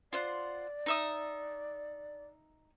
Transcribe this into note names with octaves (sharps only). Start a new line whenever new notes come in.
F4 C5 D5 F#5
D#4 E5 D#6